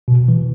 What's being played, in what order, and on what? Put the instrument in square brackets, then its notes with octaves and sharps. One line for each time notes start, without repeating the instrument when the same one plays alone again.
[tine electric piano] B2
E3